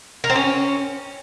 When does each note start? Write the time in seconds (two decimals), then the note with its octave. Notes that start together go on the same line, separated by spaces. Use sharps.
0.24 A#4
0.30 C4
0.36 C#4